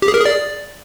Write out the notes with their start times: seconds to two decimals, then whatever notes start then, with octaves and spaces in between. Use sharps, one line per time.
0.02 G4
0.08 G#4
0.14 A#4
0.20 G#4
0.26 D5